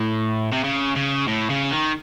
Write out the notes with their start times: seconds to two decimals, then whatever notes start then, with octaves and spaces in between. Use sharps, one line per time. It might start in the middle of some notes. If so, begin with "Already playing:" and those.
Already playing: A2
0.53 C3
0.64 C#3
0.97 C#3
1.28 A2
1.51 C#3
1.72 D#3